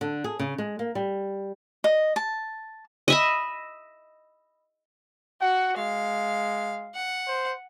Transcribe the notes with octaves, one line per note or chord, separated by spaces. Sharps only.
D3
G#4
C#3
G#3
A#3
G3
D#5
A5
D#5 E5 B5
F#4 F#5
G#3 F5
F#5
C5